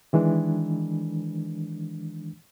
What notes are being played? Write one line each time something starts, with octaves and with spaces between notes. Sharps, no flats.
D#3 E3 G#3 D4